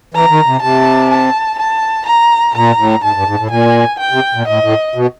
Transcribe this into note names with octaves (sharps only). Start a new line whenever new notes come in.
E3 A#5
D#3
C3
C3 A5
A5
A5
A#5
A#2 A#5
A2
G#2 A5
G2
G#2
A2
A#2 G#5
G5
C3
A#2
A2 D#5
A2
B2